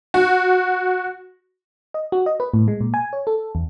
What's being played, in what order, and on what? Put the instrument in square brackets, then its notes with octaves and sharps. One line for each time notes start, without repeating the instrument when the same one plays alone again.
[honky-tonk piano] F#4
[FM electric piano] D#5
F#4
D#5
B4
A2
G#3
A#2
G#5
C#5
A4
E2